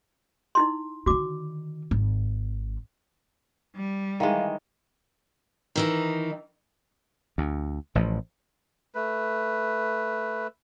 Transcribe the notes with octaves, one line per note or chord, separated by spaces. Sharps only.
D#4 E4 C6
D3 D#3 F#4 D6
G#1
G3
D#3 E3 G#3 F5
D#3 E3 D#4
D2
A1 A2 F3
A3 B4